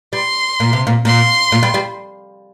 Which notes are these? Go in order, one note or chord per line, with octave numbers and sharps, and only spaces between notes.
G3 C6
A#2
C3
A#2
A#2 C6
A#2
G3
G3